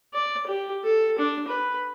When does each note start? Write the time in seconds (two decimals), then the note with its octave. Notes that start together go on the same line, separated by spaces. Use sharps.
0.14 D5
0.47 G4
0.84 A4
1.19 D4
1.48 B4